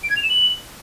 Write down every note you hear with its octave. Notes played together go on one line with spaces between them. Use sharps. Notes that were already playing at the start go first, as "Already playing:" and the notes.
D7
G#6
F7
E7
F#7